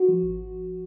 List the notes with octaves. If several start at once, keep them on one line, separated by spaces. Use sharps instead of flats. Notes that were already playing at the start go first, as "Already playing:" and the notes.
Already playing: F#4
F3
G#1